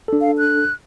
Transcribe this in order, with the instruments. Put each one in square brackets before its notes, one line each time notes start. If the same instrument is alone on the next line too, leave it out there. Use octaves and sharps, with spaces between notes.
[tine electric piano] D4 A4
[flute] F5
F#6